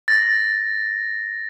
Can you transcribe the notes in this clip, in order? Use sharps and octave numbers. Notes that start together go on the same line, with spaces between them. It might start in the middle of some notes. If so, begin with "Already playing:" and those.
A6 A#6